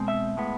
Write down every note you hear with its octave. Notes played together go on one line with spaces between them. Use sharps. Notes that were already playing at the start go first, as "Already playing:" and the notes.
Already playing: B2 G#3 C4
E5
A2 G#3 B3